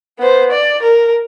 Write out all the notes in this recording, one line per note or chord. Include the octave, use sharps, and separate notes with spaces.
B3 C5
D5
A#4